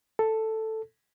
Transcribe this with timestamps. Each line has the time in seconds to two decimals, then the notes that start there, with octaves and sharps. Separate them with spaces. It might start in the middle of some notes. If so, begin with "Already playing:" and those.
0.19 A4